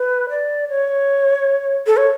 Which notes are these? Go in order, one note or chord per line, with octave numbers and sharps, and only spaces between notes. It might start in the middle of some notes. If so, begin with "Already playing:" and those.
Already playing: B4
D5
C#5
A4
C#5